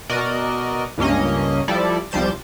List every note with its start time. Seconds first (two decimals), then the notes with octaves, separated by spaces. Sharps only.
0.10 B2 F#4 A#4 D5 D#5
0.98 C#2 G2 A#3 C#4 D#5
1.68 F3 G3 E4 A4 D5
2.11 C2 F3 G3 C5 G6 A6